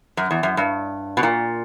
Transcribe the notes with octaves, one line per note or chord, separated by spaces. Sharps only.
F#2
E2
F#2
G2
B2
A#2